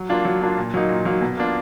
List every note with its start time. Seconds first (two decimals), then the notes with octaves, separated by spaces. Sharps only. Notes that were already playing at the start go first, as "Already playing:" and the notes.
Already playing: F#3
0.09 A#3 D4 F4
0.25 F#3
0.42 A#3 D4 F4
0.58 A#2
0.74 F#3 A#3 D#4
0.89 A#2
1.05 F#3 A#3 D#4
1.21 B2
1.37 A#3 D4 F4